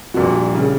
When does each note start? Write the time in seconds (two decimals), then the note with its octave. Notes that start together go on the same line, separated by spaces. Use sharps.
0.14 A#1 A#2 G3 F#4
0.54 C#3 G3